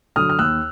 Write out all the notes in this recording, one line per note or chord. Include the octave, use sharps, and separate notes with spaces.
D3 F#3 D#6 F6
F6
D#2 E6 F#6